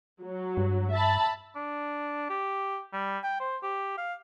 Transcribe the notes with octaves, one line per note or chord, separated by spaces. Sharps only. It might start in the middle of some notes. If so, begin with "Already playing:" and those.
F#3
G2
E5 A5 B5
D4
G4
G3
G5
C5
G4
F5